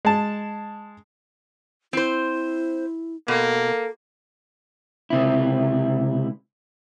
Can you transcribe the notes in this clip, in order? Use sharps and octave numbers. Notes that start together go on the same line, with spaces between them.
G#3 A5
C4 E4 C5
B2 A#3 A4
C#2 C3 E4